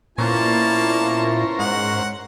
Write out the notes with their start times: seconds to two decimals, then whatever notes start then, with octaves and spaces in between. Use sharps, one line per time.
0.18 A#2 A#3 B3 C#4 E4 A#4 C5 A5
1.59 G#2 F#5